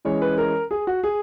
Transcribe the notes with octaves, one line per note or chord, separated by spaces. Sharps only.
E3 G#3 C#4 C#5
B4
A#4
G#4
F#4
G#4